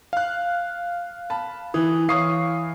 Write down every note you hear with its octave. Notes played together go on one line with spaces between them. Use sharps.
F5 F#6
A5 B5
E3 D#6
E3 C#5 F5 C#6 D#6 C7